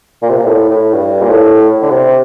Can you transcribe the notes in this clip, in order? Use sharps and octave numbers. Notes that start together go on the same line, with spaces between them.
A#2
C3
A#2
A2
A2
G2
A#2
A2
D3
C3